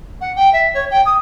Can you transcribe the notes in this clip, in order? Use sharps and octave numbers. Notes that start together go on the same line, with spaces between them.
F#5
G5
E5
C#5
G5
D#6